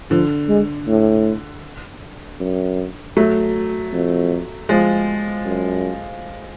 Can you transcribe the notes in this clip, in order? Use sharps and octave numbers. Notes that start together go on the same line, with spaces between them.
D3 F3
G#3
A2
F#2
F#3 A3
F2
F3 G#3
F#2